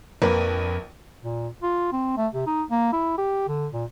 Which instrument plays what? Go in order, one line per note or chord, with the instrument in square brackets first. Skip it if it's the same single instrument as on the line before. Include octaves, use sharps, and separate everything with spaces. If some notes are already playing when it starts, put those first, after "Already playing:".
[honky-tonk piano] A#1 A#3 B4 [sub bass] F2
[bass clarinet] A#2
F4
C4
A3
C3
D#4
A#3
E4
G4
D3
A#2